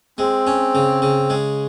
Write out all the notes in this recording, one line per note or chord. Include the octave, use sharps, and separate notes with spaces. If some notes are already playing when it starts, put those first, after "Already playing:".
G#3 C4
C#4
C#3
C#3
G#3